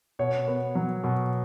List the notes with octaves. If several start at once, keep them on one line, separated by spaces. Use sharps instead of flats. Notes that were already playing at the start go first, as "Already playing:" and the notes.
B2 C#5
B3
F#3
B2